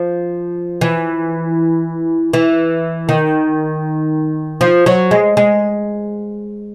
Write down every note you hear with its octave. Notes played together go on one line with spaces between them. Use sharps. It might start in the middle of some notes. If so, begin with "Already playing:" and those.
Already playing: F3
E3
E3
D#3
F3
F#3
G#3
G#3